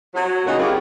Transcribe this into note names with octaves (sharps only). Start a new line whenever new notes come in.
F#3
A#2 C#3 F#3 D#4 F#4 A#4
C4 E4 F4 G4 G#4 A#4